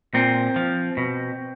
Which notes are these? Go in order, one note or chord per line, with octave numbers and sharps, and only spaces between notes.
A#2 C4
F3
B2